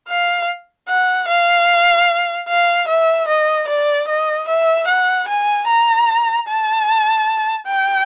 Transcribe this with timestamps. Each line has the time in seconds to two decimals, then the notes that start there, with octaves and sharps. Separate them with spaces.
0.09 F5
0.89 F#5
1.28 F5
2.49 F5
2.88 E5
3.28 D#5
3.68 D5
4.08 D#5
4.48 E5
4.87 F#5
5.28 G#5
5.68 A#5
6.48 A5
7.67 G5